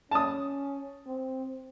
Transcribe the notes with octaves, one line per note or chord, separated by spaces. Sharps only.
C#4 A5 D#6
C4